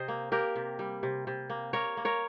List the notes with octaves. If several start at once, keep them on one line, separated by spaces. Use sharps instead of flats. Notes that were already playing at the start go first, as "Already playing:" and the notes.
Already playing: C3 C5 D#5
A#3
A#3 G4 A#4
C3
G3
C3
C3
A#3
A#3 A#4 C#5
A#3
A#4 C#5